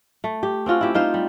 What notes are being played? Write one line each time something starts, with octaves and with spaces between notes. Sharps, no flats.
A3
G4
C4 C#4 F4 F#4
E4 G4
D#4 F4 C5
G3